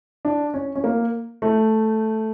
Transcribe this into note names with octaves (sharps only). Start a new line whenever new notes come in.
D4
C#4
C#4
A#3
A3